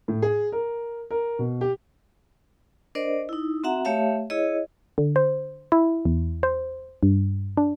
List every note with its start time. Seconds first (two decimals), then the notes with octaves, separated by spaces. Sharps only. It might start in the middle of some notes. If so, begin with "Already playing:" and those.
0.08 A2
0.22 G#4
0.52 A#4
1.11 A#4
1.39 B2
1.61 G4
2.95 D4 A#4 C5 D5 D#5
3.29 D#4 E4
3.64 C4 F#4 E5 F#5 A#5
3.85 A3 G4 C#5 E5 F5 A5
4.30 E4 G#4 C#5 D#5
4.98 D3
5.16 C5
5.72 E4
6.05 E2
6.43 C5
7.03 G2
7.57 D4